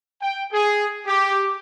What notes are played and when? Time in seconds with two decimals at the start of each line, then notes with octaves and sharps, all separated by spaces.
0.22 G5
0.53 G#4
1.06 G4